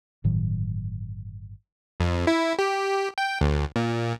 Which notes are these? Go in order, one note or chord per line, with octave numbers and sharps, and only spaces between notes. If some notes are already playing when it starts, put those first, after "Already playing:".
G1 A2 D#3 F#3
F2
E4
G4
G5
D2
A#2